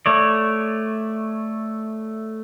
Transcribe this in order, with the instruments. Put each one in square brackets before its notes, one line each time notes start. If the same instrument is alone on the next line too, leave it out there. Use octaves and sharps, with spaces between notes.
[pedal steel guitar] A3 C#5 D5